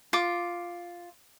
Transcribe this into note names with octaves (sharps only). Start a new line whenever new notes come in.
F4 D6